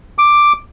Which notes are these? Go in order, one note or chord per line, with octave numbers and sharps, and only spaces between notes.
D6